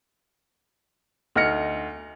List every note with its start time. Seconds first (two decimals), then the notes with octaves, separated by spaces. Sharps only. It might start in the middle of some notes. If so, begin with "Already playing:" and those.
1.36 D2 D#4 F6 A#6 C#7